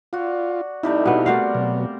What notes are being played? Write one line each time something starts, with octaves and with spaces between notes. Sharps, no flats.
F4 F#4 D5
C3 G3 A3 D#4 E4
B2 B3 F5
A3 F#4 A#4 C5 D5 F5
B2 F#3